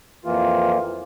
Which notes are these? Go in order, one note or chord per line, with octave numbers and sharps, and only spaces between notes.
F2 E3 A#3 F4